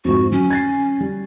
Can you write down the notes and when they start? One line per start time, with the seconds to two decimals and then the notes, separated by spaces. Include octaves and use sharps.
0.05 F2 G#2 F#4
0.32 F#3 C#4
0.50 G#6 A6 C7
1.01 G3